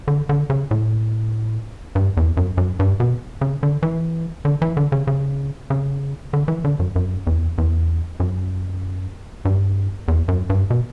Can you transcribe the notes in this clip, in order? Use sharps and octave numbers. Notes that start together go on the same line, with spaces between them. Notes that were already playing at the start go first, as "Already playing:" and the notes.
D3
D3
C#3
A2
G2
E2
F#2
F#2
G2
B2
C#3
D3
E3
D3
E3
D3
C#3
C#3
C#3
D3
E3
D3
F#2
F#2
E2
E2
F#2
G2
E2
F#2
G2
B2